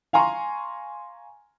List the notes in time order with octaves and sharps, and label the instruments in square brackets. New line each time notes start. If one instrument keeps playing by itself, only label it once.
[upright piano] F5 G#5 A#5 C6 C#6